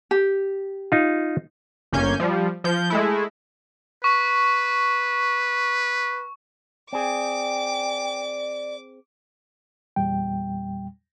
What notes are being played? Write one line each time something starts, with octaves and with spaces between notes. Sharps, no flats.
G4
D#4 F4
G1 A#3 C#4 G#5 G6
F3 G3
F3 G6
G#3 A3 E4
B4 C#6
C4 G#4 D5 G5 D6
E2 A#2 G3 G5